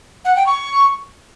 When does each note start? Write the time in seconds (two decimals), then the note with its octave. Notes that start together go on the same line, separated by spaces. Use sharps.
0.25 F#5
0.36 G5
0.46 C#6